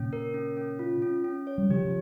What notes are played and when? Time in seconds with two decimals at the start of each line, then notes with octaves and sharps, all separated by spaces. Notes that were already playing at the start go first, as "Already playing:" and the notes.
Already playing: A#2 C#3 C#4
0.13 A#4
0.34 C#4
0.57 C#4
0.79 F4
1.02 C#4
1.24 C#4
1.47 C#5
1.58 G3
1.70 C#3 F3 G4
1.85 F3